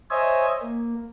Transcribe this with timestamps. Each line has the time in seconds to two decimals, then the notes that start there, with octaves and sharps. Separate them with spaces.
0.11 C5 C#5 D#5 E5 G#5
0.61 A#3